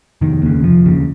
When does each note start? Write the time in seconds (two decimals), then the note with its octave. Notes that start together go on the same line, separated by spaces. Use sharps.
0.21 F1 D#3
0.42 D#2 C#3
0.63 F1 F3
0.84 D#2 C#3